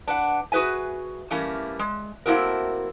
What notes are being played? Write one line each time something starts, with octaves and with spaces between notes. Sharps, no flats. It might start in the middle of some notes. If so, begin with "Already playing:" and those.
D4 B4 F#5
F#4 G#4 B4 E5 G#5
E3 G3 A3 A#3 C#4
G#3
A3 A#3 C4 E4 F#4 A#4